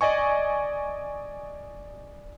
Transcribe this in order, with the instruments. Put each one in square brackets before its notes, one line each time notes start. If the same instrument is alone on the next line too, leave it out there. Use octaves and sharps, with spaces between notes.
[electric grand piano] D5 D#5 G#5 C#6